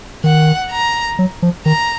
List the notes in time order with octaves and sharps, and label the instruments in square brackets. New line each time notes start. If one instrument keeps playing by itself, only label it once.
[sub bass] D#3 [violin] F#5
[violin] A#5
[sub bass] F#3
F3
[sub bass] D#3 [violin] A#5